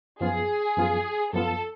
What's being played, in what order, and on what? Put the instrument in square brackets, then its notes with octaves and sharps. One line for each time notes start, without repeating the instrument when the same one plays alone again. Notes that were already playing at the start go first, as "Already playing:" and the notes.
[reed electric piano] F#2 F3 B3 F4 [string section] G#4
[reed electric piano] F#2 F3 B3 F4
[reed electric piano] F#2 F3 B3 F4 [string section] A4